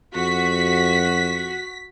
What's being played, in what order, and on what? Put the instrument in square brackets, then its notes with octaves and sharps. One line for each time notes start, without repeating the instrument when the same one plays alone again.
[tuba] F2 [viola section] F#4 [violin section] B6